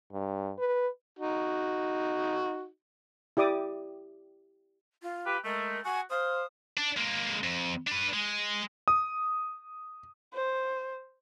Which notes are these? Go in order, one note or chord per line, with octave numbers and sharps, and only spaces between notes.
G2
B4
D#4 F#4
E4 G4 D5 D6 D#6
F4
G4 B4
G#3 A3 A#4
F#4 G#5
C5 F5 D#6
D4
G#3 A#3
F2
D4 B4
G#3
D#6
C5